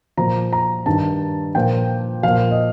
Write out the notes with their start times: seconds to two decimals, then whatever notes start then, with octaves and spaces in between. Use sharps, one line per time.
0.17 A#2 F3 A#5
0.53 A#5
0.86 G2 D#3 A5
1.55 A#2 F3 G5
2.23 A#2 F3 F5
2.51 D#5